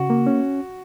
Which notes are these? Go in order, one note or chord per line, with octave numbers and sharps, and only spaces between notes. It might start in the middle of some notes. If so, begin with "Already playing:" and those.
Already playing: C#3 F#4
A#3
C#4